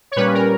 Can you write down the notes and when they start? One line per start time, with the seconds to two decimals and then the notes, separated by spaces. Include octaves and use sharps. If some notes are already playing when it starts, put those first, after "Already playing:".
0.11 C#5
0.16 A#2 G3 C#4 B4
0.34 A#4